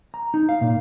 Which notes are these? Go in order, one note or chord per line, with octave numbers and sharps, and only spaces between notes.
A#5
D#4
F5
A#2